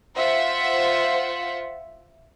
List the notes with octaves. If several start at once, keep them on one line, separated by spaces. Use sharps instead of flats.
F4 C5 E5 F#5